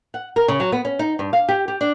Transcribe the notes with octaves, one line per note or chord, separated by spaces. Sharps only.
F#5
A#4
C#3
F#3
B3
C#4
D#4
G2
F5
G4
G4
D4